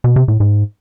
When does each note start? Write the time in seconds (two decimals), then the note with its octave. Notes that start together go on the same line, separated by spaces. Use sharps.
0.04 B2
0.16 C3
0.28 A2
0.40 G#2